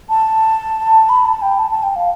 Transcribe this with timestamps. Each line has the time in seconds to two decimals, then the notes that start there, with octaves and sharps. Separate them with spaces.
0.09 A5
1.09 B5
1.26 A5
1.42 G5
1.59 A5
1.71 A5
1.83 G5
1.96 F5